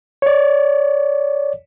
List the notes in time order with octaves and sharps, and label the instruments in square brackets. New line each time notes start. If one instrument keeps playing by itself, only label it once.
[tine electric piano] C#5 D5